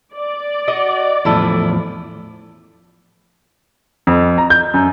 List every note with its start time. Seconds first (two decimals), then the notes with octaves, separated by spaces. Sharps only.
0.15 D5
0.68 F#4 D#5
1.25 E2 A2 F3 E4 A4
4.07 F2
4.38 A#5
4.50 G6
4.74 F#2